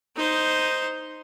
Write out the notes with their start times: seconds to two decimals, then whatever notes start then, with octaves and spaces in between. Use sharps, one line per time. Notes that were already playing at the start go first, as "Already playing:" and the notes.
0.16 D#4 C5